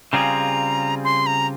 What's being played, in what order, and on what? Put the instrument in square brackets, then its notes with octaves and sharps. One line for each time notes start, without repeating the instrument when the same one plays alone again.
[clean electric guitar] C#3 G3 C4 F4 G#4 [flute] A#5
[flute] C6
A#5